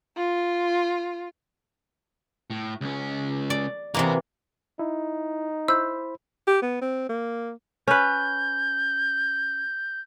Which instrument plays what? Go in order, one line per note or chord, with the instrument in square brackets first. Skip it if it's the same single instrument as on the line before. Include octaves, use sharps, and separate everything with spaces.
[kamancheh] F4
[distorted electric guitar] A2
C#2 C#4
[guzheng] D5
[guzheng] C3 E3 A#3 [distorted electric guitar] F#4 B4
[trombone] D#4 [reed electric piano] E4
[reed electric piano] E4 C5 B5 [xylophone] E6 G6
[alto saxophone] G4
B3
C4
A#3
[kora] C#4 B4 [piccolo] G6